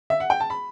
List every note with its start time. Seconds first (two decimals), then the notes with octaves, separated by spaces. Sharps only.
0.10 E5
0.20 F#5
0.30 G5
0.40 A5
0.50 B5